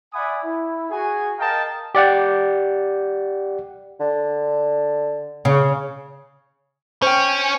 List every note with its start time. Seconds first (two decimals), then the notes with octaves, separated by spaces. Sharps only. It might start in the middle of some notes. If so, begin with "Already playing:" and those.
0.13 D5 E5 F#5 G#5 B5 D#6
0.43 E4
0.90 F#4 G#4 G#5
1.39 A#4 D#5 F5 G5 A5 A#5
1.95 G4 D5 F#5 G5
4.00 D3
5.45 C#3
7.02 C#4 C5 G5